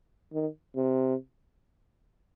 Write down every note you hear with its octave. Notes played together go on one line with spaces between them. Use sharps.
D#3
C3